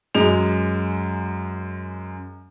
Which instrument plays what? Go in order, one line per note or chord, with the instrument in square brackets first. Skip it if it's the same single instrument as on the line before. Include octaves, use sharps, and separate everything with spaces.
[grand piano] F#2 G#3 F7